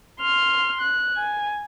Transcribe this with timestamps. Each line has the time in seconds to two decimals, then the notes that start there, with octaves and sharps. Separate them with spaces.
0.21 C6 F6
0.80 F#6
1.17 G#5